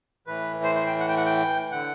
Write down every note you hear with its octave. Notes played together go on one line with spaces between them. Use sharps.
A2 E3 B4
C5
C5
G5
F#5
G5
F#5
G5
D3 F#5